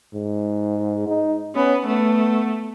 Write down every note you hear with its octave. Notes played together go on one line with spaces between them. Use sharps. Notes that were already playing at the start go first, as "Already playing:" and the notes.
G#2
D#4
B3 C#4
A3 B3